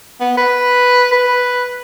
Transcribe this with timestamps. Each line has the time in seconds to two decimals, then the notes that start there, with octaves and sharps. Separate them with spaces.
0.21 B3
0.37 B4
1.13 B4